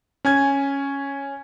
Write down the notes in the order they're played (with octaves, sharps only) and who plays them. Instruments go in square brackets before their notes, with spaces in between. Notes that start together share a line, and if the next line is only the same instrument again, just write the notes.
[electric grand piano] C#4 G#5 G#6